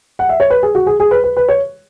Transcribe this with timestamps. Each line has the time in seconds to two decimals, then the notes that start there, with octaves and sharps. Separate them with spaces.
0.19 F#5
0.29 E5
0.40 C#5
0.50 B4
0.63 G#4
0.75 F#4
0.86 G#4
1.00 G#4
1.11 B4
1.24 B4
1.37 B4
1.48 C#5